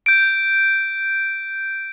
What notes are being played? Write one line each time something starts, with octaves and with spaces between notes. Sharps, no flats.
G6 D7